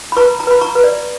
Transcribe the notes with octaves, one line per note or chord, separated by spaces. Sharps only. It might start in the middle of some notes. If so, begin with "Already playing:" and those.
B5
B4 A#5 C#6
A#5
B4 B5
A#5 C#6
B4
D5